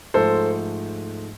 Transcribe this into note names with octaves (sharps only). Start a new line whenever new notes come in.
G#2 F3 A3 A4 C5